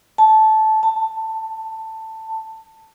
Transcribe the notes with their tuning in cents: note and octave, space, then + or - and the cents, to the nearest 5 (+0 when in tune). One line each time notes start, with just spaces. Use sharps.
A5 -15
A5 +15